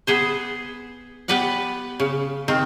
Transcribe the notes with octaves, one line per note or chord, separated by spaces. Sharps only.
B3 G#4 C5
B3 G4 B4 D5 F#5
C#3
D#3 C4